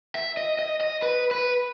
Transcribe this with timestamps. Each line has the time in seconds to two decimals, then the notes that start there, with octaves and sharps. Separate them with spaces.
0.15 E5
0.37 D#5
0.59 D#5
0.81 D#5
1.02 B4
1.31 B4